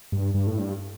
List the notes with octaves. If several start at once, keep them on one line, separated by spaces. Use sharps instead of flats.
G2
G2
A2
G2